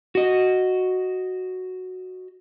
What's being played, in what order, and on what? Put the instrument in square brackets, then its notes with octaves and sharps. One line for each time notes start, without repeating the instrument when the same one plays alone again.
[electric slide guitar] F#4 D#5